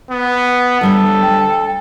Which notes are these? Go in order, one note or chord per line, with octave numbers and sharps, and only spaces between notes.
B3
D2 G3 A4 C#5
G5